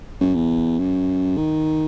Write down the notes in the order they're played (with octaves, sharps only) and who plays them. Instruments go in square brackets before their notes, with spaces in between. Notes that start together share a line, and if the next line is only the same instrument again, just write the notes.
[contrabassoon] F#2
E2
F#2
D#3